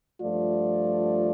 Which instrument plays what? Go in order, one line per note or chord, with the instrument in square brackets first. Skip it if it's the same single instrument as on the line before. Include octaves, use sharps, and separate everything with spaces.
[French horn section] G2 F3 A3 F4 D5